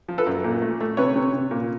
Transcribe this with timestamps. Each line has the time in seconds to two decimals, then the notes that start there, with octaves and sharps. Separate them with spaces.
0.08 F3
0.18 A4 B4
0.26 F#2
0.44 A#2
0.62 A3
0.81 A3
0.97 C3 B4 C#5
1.16 C3
1.33 C3
1.51 A#2